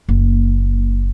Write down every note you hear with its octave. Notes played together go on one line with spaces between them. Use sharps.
F#1 A#3